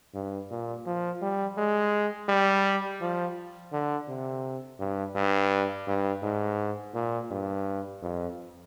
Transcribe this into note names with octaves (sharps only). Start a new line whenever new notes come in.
G2
A#2
F3
G3
G#3
G3
F3
D3
C3
G2
G2
G2
G#2
A#2
G2
F2